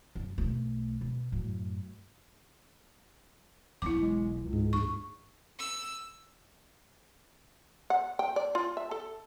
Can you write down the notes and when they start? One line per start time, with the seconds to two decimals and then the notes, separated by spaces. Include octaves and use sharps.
0.15 F#1
0.38 B1 A3
1.01 B2
1.32 F#2 A2
3.82 E1 B1 B3 E4 D6
4.01 G#3
4.39 C#2
4.53 G#2
4.73 D2 C#6
5.59 E6
7.90 F#5
8.19 G5
8.36 D5
8.55 F4
8.77 E5
8.91 A4